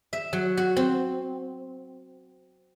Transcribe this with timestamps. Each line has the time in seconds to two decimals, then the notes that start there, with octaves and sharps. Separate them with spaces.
0.13 E5
0.33 F#3
0.57 F#4
0.77 C4